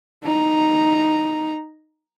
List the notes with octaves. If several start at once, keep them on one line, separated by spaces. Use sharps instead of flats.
D#4 A#5